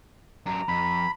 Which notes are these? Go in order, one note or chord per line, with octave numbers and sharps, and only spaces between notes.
F#2 D4 A#5
F2 B5